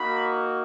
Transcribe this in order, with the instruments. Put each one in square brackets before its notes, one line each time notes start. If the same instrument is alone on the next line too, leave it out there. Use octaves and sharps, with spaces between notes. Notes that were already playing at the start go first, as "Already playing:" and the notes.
Already playing: [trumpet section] A#3 D#4 F#4 B5